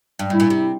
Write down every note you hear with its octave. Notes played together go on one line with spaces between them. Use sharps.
G2
A2 E4
A#2
C3